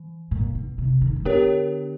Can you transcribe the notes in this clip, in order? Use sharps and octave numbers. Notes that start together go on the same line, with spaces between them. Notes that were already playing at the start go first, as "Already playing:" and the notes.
Already playing: E3
A#2
B2
C3
D#3
D3
D#3
D3 B3 D4 G4 A#4 C#5